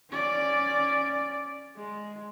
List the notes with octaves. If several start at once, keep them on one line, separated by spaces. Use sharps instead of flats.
C#4 D5
G#3